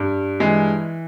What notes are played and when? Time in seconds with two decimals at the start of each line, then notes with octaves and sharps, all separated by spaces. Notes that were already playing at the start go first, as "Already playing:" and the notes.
Already playing: G2
0.40 E3 G#3